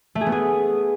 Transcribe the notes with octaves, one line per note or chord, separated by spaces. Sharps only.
A3
G#4
B3
G#4